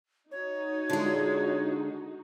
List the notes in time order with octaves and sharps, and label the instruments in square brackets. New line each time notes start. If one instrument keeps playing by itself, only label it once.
[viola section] D#4 F#4 [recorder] C#5
[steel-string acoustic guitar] D3 G#3 [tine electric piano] D4 F4 G#4